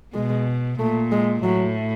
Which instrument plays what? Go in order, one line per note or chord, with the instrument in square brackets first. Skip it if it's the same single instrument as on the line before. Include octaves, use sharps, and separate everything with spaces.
[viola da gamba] B2 [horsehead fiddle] G#3
[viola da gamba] A#2 [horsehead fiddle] A3
[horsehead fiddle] G#3
[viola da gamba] A2 [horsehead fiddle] F#3